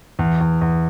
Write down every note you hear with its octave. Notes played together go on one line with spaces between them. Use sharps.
E2
E2
E2